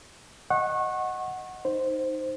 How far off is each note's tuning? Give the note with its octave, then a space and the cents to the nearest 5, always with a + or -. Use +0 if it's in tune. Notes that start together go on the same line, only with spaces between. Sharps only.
D#5 +0 F#5 +0 C#6 -25
D#4 +0 C5 +0